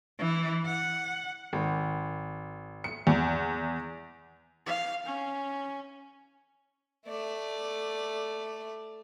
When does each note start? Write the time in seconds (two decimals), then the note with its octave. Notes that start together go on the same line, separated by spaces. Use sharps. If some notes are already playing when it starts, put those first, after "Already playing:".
0.19 E3
0.66 F#5
1.53 G#1
2.84 C#7
3.07 E2
4.66 F5
5.05 C#4
7.07 A3 D5